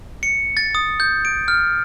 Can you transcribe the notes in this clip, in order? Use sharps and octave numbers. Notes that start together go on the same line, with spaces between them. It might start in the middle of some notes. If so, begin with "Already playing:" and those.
C#7
A6
D#6
G6
D7
F6